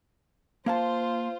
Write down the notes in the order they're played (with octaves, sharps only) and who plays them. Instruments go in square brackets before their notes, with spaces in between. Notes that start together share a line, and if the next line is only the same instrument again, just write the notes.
[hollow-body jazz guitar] A#3 F5 A5 [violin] F4 C5